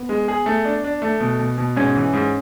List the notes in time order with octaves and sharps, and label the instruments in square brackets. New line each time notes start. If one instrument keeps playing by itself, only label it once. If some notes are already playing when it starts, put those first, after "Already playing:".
Already playing: [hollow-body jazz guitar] B3
[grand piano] G#3
G#4
A3
D4
D4
A3
B2
B2
B2
[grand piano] G#2 [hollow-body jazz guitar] C#4
[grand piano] E3
G#2